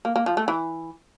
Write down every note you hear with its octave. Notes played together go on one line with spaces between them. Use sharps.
A#3
A#3
F3
A3
E3